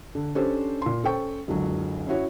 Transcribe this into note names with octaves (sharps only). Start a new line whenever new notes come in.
D3
C#4 D4 G4 A4 C5
A#2 C6
C#4 A4 C5 G5 C#6
F#1 C#2 D3 F#3
C#4 E4 F#4 C#5